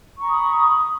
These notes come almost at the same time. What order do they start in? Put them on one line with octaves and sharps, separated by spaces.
C#6 A#5 B5 D#6